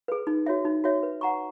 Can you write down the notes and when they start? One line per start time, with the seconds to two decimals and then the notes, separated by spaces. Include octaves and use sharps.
0.08 G#4 B4
0.27 D#4
0.46 F#4 C#5 E5
0.65 D#4
0.84 F#4 C#5 E5
1.03 B4
1.21 F#5 A#5 C#6